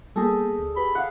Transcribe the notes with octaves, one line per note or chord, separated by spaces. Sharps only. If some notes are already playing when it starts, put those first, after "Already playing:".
G3 A#3 B3 G#4 A4
D2
G4 B4 B5
F5 F#5